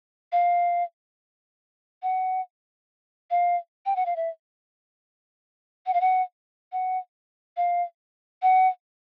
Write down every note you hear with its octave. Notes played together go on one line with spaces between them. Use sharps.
F5
F#5
F5
G5
F#5
F5
E5
F#5
F5
F#5
F#5
F5
F#5